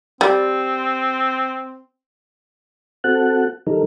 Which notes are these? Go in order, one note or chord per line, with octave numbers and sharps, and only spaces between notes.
G3 C4
C4 F#4 A4 F#5 A5 F#6
D#3 G3 D#4 A4 A#4